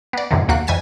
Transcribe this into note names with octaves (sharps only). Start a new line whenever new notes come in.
B3 D5
F#2 A2 C3 D#3
D#2 A#3 F#4 F#6
F2 E3 G#5 B6 E7